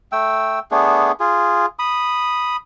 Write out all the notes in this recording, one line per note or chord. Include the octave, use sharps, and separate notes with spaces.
A3 G5 E6
A3 B3 D4 G#4
F4 G#4
B5 D#6